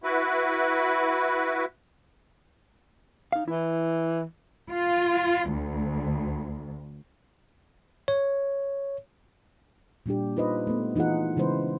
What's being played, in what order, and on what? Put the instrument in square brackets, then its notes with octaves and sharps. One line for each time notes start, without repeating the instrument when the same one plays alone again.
[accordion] E4 F#4 B4
[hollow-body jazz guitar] D#4 F5
[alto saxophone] E3 [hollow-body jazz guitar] E4
[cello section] F4
D2
[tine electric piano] C#5
[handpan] A#2 G3 D4 G4
D#4 F4 B4 C5 D#5
A3 B3
E3 D#4 F4 G#4 F#5
C#3 E3 G#3 E4 B4 C5